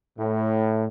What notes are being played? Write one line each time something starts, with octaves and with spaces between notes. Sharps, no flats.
A2